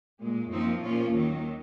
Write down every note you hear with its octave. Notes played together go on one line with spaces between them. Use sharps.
A#2 G#3
F#2 F3 A#3 C4 D#4
A#2 F3 A#3 C#4 F4
D#2 D#3 F#3